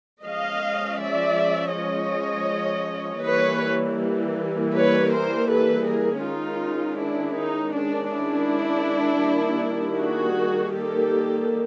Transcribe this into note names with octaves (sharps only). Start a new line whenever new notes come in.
F3 G#3 C#4 D#5 F5
D5 E5
C#5 D#5
E3 G3 A#3 B4 C#5
B4 C#5
A#4 C5
A4 B4
G#4 A#4
D#3 G#3 C#4 D#4 F4
D4 E4
D#4
D4
D4 E4
D#3 G3 A#3
F#4 G#4
G4 A4